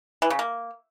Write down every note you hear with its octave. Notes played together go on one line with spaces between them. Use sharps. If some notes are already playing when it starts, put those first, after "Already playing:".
E3
C#3
A#3